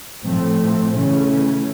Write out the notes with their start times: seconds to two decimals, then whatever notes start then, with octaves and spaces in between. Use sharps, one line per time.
0.24 A2 F3 A3 C4
0.95 C#3 E3 A3 C#4